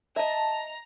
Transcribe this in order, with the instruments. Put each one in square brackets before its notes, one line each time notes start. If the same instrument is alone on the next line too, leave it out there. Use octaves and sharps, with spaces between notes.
[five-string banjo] D#5 E5 [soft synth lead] A5 [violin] A#5